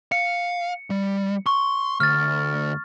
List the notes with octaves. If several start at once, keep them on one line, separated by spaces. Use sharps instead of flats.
F5 C#7
G3
C6 C#6
D2 F6 A6